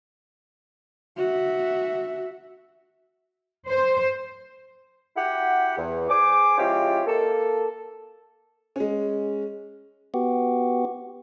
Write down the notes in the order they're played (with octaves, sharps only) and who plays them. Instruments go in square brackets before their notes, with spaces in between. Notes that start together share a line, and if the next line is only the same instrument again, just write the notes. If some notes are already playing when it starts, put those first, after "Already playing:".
[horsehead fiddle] F#4 E5
[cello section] C5
[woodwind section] E4 F#4 G4 F#5
E2
G#4 C5 G#5 D6
F3 G#3 C#4 E4 F4 G4
A#3 A4
[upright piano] G#3 C#4
[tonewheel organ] B3 F#4 G4